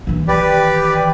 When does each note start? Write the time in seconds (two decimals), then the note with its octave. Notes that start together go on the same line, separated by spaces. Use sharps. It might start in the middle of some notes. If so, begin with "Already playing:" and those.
0.07 D#3 E3
0.28 G4 B4 D5